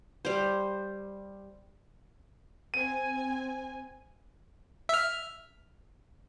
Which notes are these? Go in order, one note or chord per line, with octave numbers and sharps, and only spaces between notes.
G3 C5
C4 G#5 D#7
E5 F6